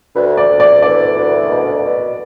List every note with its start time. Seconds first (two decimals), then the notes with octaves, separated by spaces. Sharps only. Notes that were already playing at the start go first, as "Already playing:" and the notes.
0.16 D2 B4
0.37 D5
0.49 D2
0.60 D5
0.82 E3 D5
1.16 D2
1.50 B2
1.83 B2